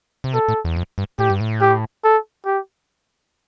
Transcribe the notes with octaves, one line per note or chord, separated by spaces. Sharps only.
C3
B2 A4
A2
E2
F2
G2
A2 G4
G2
A2
G4
A4
G4